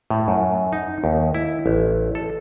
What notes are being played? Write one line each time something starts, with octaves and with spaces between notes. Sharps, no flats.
A2
F#2
D#4
D#2
E4
A1
A4